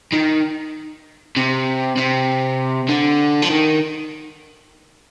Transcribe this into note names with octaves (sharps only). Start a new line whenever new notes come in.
D#3
C3
C3
D3
F3
D#3